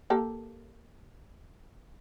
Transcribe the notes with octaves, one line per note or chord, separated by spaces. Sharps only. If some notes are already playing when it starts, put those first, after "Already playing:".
A#3 G4 A4